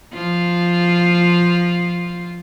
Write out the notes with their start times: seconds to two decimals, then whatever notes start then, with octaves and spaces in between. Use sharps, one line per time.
0.13 F3 F4